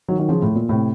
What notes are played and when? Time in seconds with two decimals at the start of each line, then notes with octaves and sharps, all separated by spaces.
0.08 D#3 F#3
0.19 D#3 F#3
0.29 C#3 F3
0.42 A2
0.55 A#2
0.69 A2 C3